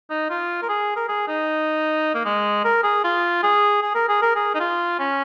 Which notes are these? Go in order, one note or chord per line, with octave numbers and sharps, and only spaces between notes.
D#4
F4
A#4
G#4
A#4
G#4
D#4
A#3
G#3
A#4
G#4
F4
G#4
G#4
A#4
G#4
A#4
G#4
D#4
F4
C#4